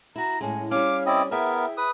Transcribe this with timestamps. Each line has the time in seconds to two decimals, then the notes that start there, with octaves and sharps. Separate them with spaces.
0.16 E4 F#4 A#5
0.41 A2 G#3 C#4
0.71 G3 C#4 F5 D6
1.06 C4 E4 D5 D#5
1.31 B3 E4 G#4 A#4 E5 G5
1.77 B4 D#6